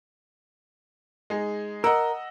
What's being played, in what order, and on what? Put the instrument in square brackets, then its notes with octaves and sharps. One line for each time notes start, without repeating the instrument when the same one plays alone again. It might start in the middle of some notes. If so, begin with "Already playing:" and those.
[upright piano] G#3 D#4 G#4
[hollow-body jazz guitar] A#4 [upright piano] D#5 F#5 E6